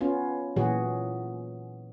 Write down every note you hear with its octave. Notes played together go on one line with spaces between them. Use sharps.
B3 C#4 F4
A#2 E3 F#3 F#4 G#4